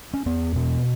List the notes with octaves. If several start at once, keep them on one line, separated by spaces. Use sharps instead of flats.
C#4
E2 B3
B2 B3